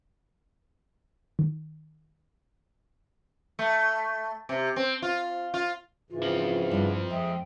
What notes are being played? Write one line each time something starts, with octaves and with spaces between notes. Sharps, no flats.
D#3
A3
C3
C4
F4
F4
G#2 C#3 E3 F4
F3 C4
G2 D4 E4
F2 G#3 D#5 E5 G5